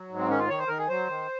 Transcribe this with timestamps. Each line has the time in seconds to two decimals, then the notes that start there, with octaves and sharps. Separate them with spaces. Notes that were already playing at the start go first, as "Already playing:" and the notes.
Already playing: F#3
0.09 G#2
0.19 C4
0.29 D#3 C#4
0.39 F4
0.49 D#3 C#5
0.58 C5
0.68 D#3 A#4
0.78 G#4
0.88 F#3 C5
1.08 D#3